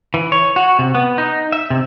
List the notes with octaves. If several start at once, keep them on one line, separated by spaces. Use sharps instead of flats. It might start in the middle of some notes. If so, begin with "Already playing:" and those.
E3
C#5
F#4
C3
B3
D#4
E5
C3